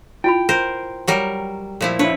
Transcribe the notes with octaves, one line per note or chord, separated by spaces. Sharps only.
E4 F4 G5 B5
A#4 C5
F#3 G3 A#4
A#2 F3 E4
D4 E4 B4 C#5